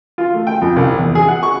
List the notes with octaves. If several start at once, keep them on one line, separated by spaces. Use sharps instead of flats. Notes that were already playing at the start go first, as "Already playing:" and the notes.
F4
A3
G5
F2
C2
E2
G#4
F#5
C#6